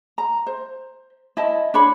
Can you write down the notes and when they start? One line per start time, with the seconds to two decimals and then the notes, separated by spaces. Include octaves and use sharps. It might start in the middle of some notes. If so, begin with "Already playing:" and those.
0.18 A#5
0.47 C5
1.37 E4 D#5 A5
1.74 D4 C#5 B5